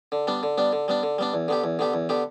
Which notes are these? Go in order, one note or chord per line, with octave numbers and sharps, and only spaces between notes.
D3
G3 B3 D4
D3
G3 B3 D4
D3
G3 B3 D4
D3
G3 B3 D4
E2
D3 B3 G4
E2
D3 B3 G4
E2
D3 B3 G4